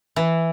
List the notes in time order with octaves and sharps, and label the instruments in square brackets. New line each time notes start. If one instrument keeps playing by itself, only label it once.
[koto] E3